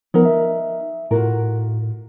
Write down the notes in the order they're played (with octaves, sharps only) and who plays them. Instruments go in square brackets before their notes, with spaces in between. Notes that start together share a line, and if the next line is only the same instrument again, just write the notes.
[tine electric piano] F3 B3 [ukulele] D#4 A#4
[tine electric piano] E5
[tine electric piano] A2 [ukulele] F4 F#4 A#4